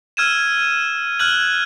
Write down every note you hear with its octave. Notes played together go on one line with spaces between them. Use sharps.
E6 F6 G#6 D#7 E7
F6 F#6 G#6 F#7